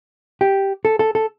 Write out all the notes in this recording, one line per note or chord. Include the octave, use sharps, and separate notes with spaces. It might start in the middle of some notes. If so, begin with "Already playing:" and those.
G4
A4
A4
A4